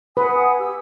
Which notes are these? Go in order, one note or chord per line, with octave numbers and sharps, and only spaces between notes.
B4 F#5 G#5 D#6
G4 E6